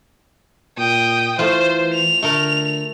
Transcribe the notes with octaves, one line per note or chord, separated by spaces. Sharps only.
A#2 G5 D#6
E3 A3 F4 C5
F7
D3 A3 A4 A#4